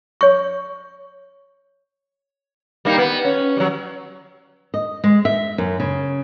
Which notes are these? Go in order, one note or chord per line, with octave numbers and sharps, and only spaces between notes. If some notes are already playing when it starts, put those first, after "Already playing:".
C#5 C#6
G3 A#3 D#4
B3
C#4
F#3 G3
D#5
G#3
E5
F#2
C#3